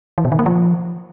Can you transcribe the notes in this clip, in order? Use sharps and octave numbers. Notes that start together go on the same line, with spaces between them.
E3
B2
D#3
A#3
F3